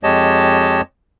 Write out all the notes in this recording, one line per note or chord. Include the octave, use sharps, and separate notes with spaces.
F2 G#3 G4 C#5 D#5 A5